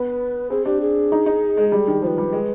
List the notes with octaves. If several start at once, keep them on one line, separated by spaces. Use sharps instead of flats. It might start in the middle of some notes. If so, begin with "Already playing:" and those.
Already playing: B3 B4
C4 G#4
D4 G4
G#4
D#4
D#4
G#3
G3
D#3
F3 B4 C5
G3
G#3